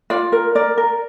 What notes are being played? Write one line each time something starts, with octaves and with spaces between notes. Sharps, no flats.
F4 D5
A#4
A#4 D5
A#4